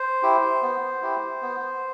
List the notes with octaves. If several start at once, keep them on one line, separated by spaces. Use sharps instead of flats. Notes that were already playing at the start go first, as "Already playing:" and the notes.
Already playing: C5
E4 G4
B3
E4 G4
B3